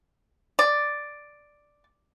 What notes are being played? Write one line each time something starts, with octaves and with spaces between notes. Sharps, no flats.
D5